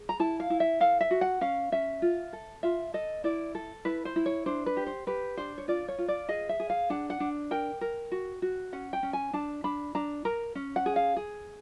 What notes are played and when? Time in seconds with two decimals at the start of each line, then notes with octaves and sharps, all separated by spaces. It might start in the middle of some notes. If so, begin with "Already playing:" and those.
Already playing: G#4
0.09 A#5
0.20 E4 A5
0.40 F5
0.50 E4
0.60 E5
0.80 A4 F5
1.01 E5
1.11 F#4
1.21 F#5
1.41 C#4 F5
1.72 C#4 E5
2.02 F4
2.33 A4
2.63 F4 E5
2.94 A4 D#5
3.24 E4 D5
3.55 A4
3.85 E4 B4
4.05 C5
4.16 E4
4.26 C#5
4.46 D4 C5
4.66 B4
4.77 G4
4.87 C5
5.07 G4 B4
5.37 D4 C5
5.58 C#5
5.68 F4 D5
5.88 C#5
5.98 F4
6.08 D5
6.29 G#4 D#5
6.49 E5
6.60 G#4
6.70 F5
6.90 D4 F#5
7.10 F#5
7.20 D4
7.51 A#4 G5
7.81 A#4
8.12 F#4
8.42 F#4
8.73 C#4 F#5
8.93 G5
9.03 C#4
9.13 G#5
9.33 D4 A5
9.64 D4 B5
9.95 D4 A#5
10.25 A#4 A#5
10.55 C#4
10.76 F#5
10.86 G#4
10.96 F5
11.16 G#4